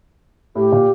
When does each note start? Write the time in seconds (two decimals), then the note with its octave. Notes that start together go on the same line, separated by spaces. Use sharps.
0.55 A2 G4
0.72 A#2